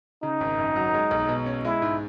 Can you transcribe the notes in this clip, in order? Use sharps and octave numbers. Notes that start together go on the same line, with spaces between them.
C#3 D#4
G#1
F#2
F#3
G#3
B1
B2
C#4
G#3 E4
G#2